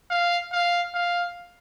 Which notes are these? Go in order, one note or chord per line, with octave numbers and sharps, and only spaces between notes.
F5
F5
F5